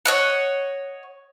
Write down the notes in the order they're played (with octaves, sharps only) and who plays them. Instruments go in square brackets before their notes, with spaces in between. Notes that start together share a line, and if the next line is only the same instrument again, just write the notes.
[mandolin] C#5 D#5 F#5